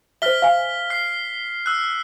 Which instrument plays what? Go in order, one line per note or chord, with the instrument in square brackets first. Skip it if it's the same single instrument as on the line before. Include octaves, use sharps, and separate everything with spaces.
[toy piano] C5 E5 [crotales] F6 B6 G7
[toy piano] F5 G#5
[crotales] F6 C7
E6 F#6